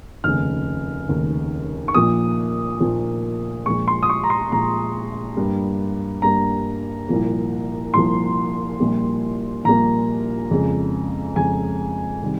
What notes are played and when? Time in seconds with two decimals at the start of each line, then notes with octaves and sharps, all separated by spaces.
0.24 F1 D#2 C#3 F6
1.09 F1 D#2 C#3
1.88 C#6
1.94 A#1 A#2 F3 A#3 D#6
2.80 A#1 A#2 F3 A#3
3.66 A#1 A#2 G#3 C#6
3.88 C6
4.03 D#6
4.10 C#6
4.24 A#5
4.30 C6
4.51 A#1 A#2 G#3 A#5
5.37 G2 G3 A#3
6.22 G2 G3 A#3 A#5
7.09 C2 A#2 F3 A#3
7.94 C2 A#2 F3 A#3 C6
8.80 A#1 A#2 G3 A#3
9.64 A#1 A#2 G3 A#3 A#5
10.51 F2 C#3 G#3
11.36 F2 C#3 G#3 G#5
12.22 C3 D#3 G3